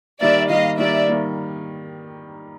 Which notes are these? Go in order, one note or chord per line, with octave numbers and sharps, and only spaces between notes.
D#3 G3 A#3 D5 E5
D#3 G3 A#3 D#5 F5
D#3 G3 A#3 D5 E5
D#3 G3 A#3